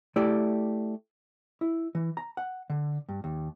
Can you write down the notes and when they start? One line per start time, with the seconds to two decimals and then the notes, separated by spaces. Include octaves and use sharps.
0.16 A3 E4 G4 D5
1.61 E4
1.95 E3
2.17 A#5
2.37 F#5
2.70 D3
3.09 G2
3.24 D#2